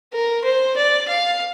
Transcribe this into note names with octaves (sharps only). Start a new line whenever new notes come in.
A#4
C5
D5
F5